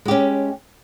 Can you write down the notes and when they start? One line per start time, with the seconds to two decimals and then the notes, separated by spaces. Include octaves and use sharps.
0.05 G#3
0.08 G4
0.11 C#4